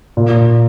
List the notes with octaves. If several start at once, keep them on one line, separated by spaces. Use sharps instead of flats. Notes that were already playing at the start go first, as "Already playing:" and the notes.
A#2